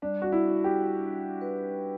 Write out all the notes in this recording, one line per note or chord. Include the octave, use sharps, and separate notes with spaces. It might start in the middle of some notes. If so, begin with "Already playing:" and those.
G3 D4
F#4
E4
F#4
G4
D4
B4